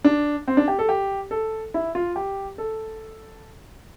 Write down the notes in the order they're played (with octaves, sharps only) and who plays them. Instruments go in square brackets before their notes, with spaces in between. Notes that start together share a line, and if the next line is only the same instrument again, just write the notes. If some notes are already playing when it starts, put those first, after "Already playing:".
[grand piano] D4
C4
D4
G4
A4
G4
A4
E4
F4
G4
A4